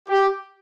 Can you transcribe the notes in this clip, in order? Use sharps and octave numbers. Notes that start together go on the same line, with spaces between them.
G4